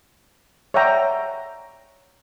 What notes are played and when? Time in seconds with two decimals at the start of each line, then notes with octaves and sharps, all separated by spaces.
0.74 C#5 D5 E5 F#5 G5 A#5